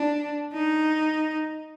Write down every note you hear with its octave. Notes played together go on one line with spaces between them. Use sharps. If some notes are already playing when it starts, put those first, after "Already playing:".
Already playing: D4
D#4